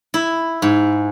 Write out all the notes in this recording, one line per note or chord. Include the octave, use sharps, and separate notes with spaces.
E4
G#2